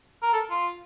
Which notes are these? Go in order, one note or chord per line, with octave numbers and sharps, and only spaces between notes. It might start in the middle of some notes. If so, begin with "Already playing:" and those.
A#4
A4
F4